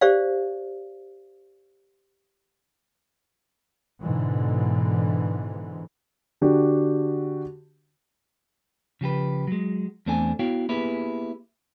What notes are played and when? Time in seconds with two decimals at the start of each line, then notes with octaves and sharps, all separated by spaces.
0.01 G4 C5 D5 F5
4.02 G#2 B2 D3 E3
6.41 D3 D4 F#4 G4
9.01 C#3 F3 G4 B4
9.47 F#3 G#3
10.06 E2 A3 C4 D4 A4 G#5
10.39 B3 E4 F#4 C#5 F5 G5
10.69 A#3 B3 E4 G4 G#4 B4